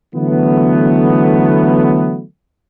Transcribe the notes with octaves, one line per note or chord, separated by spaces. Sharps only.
D3 E3 F#3 A3 B3